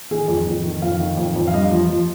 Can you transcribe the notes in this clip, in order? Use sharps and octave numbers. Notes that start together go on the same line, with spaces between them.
D#3 G#4
F2
F2
D#3
F2 F5
D#3
F2
F2
F5
G2 D#5
F3
F3